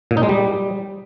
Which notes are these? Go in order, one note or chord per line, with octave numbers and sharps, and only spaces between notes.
A#2
D#4
G#3
G3